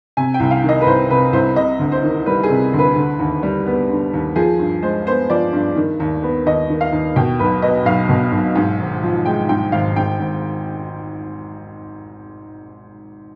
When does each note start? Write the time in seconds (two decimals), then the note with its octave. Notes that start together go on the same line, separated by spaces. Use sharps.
0.17 C3 G#5
0.34 G5
0.40 C2
0.51 F5
0.63 D#3
0.69 D#5
0.81 B4
0.86 C2 C5
1.10 C3 B4
1.33 C2 C5
1.56 C3 D#5
1.79 D2
1.92 C5
2.03 D#3
2.26 G3 B4
2.43 G#4
2.49 C3
2.73 D2
2.79 B4
2.96 D3
3.19 D#2
3.43 G3
3.66 B3
3.90 D3
4.13 D#2
4.36 F3 G#4
4.59 G2
4.82 G#3 C5
5.06 B3 C5
5.30 F3 D5
5.53 G2
5.76 D#3
6.00 D#2
6.23 B3
6.46 D#2 D#5
6.70 D#3
6.81 F5
6.92 D#2
7.16 B2 G5
7.39 B1 B4
7.62 B3 D#5
7.85 B1 F5
8.09 B2
8.32 B1
8.55 G#2
8.80 G#1
9.03 F3
9.25 G#3 G5
9.49 G#2 G5
9.72 G#1 F5
9.96 G#2 G5
10.19 G#1